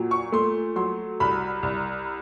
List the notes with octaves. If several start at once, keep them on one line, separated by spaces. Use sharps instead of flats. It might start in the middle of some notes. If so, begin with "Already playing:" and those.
Already playing: A#2 F#3
C#6
A3 C6
F#3 C6
C2 B5
C2